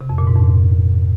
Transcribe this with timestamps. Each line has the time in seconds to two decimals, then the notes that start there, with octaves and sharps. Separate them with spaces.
0.01 C3
0.09 F2
0.18 A#2
0.27 G#2
0.36 F2